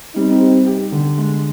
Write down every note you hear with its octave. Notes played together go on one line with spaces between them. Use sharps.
G3 C4 D#4
G4
G4
D3
G#3